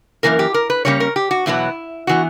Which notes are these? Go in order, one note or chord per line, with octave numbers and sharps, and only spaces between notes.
F#2 C#3 E3 A#3 A#4
G4
A#4
B4
C#3 G3 A#3 C#4 C#5
A#4
G4
F#4
E2 B2 F#3 B3 E4
E3 B3 F#4